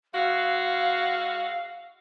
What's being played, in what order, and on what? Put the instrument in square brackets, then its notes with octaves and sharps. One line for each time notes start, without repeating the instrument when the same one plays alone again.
[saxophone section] G#3 E4 F#4 [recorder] F5